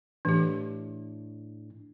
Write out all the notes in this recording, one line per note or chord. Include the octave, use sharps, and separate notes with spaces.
A2 E3 D4 G4